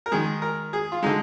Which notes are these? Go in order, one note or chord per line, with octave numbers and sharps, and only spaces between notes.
A#4
D#3 G#3 G#4
A#4
G#4
F4
D3 G#3 D#4